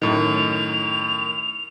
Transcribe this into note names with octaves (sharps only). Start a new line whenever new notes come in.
F#2 A2 D#3 F7